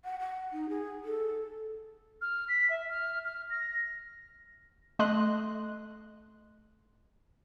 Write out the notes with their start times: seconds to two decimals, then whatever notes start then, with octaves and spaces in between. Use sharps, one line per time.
0.04 F#5
0.20 F#5
0.52 D#4
0.69 G#4
1.04 A4
2.21 F6
2.48 B6
2.70 E5
2.89 F6
3.24 F6
3.50 A#6
4.99 A3 D#5 C6 F#6